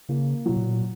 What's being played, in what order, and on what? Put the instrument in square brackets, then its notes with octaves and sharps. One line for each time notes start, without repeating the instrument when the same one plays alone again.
[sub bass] C#3 [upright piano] A#3
[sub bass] B2 [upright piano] F#3
[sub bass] A#2